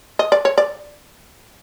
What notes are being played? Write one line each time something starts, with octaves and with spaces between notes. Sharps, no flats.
D#5
D5
C#5
D5